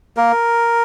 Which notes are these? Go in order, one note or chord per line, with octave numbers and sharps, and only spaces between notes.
A#3 A#4